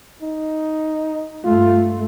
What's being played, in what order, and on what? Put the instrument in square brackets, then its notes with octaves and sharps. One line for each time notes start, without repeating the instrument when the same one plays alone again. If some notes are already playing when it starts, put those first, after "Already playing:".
[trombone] D#4
[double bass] G2 A3 [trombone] F4